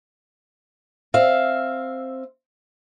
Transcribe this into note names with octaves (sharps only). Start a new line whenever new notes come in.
C4 E5 F5